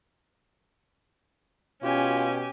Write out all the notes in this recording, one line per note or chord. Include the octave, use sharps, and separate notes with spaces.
B2 C#4 F4 G4 G#5